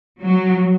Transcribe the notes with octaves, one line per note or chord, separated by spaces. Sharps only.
F#3